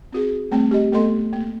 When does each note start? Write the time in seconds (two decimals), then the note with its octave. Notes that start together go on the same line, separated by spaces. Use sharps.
0.12 C4 F#4 G#4
0.51 G3 A3 C4 G5
0.71 G4 D#5
0.92 A3 B3 A4 D#5 C6
1.33 A#3